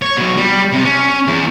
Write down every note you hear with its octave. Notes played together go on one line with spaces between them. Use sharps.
C#5
B2 F#3
G3
C3
C#4
E2